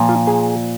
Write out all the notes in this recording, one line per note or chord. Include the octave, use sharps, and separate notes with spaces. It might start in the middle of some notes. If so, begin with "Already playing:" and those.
Already playing: A#2 F3
F4
G#4